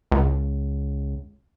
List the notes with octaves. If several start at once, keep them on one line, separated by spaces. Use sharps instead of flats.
C#2